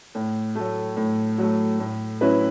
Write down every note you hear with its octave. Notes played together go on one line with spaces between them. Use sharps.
A2
F#3 A3
A2
F#3 A3
A2
F#3 C#4 E4 B4